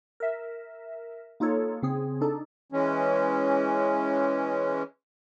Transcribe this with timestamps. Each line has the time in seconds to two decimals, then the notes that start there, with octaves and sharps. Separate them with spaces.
0.20 A#4 E5
1.40 A#3 D#4 F4 A4 C#5
1.82 C#3 C4 G#4
2.21 D4 D#4 A4
2.72 E3 G#3 C#4